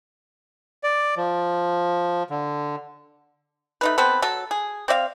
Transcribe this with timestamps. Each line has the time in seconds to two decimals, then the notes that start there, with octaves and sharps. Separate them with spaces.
0.83 D5
1.17 F3
2.30 D3
3.81 A3 D#4 B4
3.98 B3 C4 A4 B4
4.22 F#3 A4
4.51 G#4
4.88 C4 D5 E5 F5